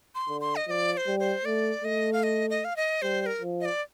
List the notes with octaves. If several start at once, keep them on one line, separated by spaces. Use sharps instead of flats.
C6
D3
C6
D#5
F3 D5 D#5
D5
C5
G3
C5
A3 D5
A3 D#5
F5
D#5
D#5
F5
D#5
G3 C5
C5
A#4
F3
D#5
D5